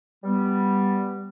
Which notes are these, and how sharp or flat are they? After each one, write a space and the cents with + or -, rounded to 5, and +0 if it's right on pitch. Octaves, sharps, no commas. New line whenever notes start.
G3 +0 B3 +0